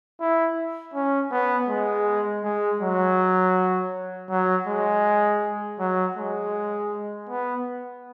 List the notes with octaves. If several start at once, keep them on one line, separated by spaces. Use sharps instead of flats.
E4
C#4
B3
G#3
G#3
F#3
F#3
G#3
F#3
G#3
B3